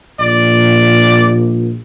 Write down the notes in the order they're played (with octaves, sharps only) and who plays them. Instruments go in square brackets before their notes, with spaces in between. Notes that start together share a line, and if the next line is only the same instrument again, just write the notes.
[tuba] A#1 [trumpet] D5